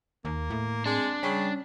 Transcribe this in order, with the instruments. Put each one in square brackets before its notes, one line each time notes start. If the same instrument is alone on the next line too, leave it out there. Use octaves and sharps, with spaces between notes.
[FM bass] D#2 [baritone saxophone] A#3
[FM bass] A2
[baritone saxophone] G#3 [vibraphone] C4 [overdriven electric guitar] D4
[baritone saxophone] C#3 [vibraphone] G3 [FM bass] C#4